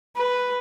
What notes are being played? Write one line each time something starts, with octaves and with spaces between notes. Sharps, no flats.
B4